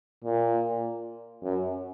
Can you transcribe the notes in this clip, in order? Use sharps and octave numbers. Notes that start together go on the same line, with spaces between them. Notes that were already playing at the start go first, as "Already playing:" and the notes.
A#2
F#2